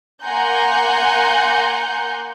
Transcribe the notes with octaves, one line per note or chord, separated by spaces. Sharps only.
A#3 F#5 G#5 A#5 C6 G6